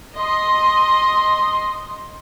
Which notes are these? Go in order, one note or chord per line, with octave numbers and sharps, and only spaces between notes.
D#5 C6